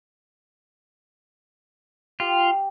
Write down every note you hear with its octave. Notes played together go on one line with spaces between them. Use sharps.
F4 G4